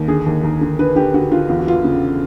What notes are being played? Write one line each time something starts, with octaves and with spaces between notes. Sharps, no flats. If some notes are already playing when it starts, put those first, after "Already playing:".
Already playing: D#2
D3 G#4
D#2
D#2 A#4
D3
D3 B4
D3 G4
D3 F#4
D3 F4
E2 F4
F#4
E3 F4
C#3